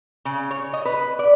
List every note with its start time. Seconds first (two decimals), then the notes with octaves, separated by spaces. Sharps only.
0.25 C#3
0.51 C#5
0.73 D#5
0.85 B4
1.19 D5